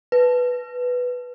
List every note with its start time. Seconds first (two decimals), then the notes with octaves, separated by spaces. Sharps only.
0.12 B4